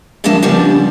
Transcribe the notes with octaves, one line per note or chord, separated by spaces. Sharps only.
F#2 D3 F3 A#3 E5 A5
C#3 F3 G3 B3 D4